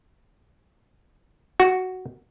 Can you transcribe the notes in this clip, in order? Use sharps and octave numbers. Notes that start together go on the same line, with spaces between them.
F#4